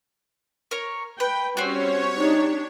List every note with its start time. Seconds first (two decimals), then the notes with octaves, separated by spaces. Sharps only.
0.71 A#4 C#5
1.20 B4 G5
1.57 G3 C4 C#4 F#4 C5 C#5
2.16 D4 D#4 G4